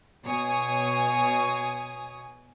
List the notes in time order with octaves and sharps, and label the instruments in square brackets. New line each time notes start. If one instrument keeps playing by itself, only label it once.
[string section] B2 C#5 G#5 D#6